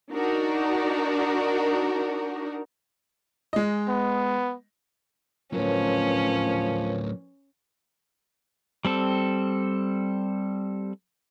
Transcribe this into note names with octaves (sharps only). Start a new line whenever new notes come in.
D4 D#4 F#4 A#4
G#3 D#5
B3
A2 F3 F#3 C#4 A#4 B4 C#5
G3 C4 A4